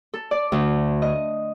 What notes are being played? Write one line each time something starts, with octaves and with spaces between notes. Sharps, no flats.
A4
D5
D2
D#5